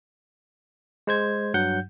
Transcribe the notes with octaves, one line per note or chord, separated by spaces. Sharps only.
G#3 C5 G#6
G2 F#3 F#5 G6